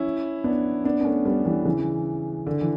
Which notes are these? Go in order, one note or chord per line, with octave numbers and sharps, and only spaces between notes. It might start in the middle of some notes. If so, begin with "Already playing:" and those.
Already playing: C#4 E4
B3 D4
B3 D4
B3
A3 C#4
G3 B3
E3 G3
C#3 E3
D3
E3